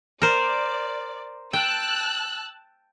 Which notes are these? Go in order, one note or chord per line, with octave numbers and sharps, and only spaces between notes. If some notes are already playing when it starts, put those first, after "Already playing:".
A#4 C5 D5
G5 A5 E6 F#6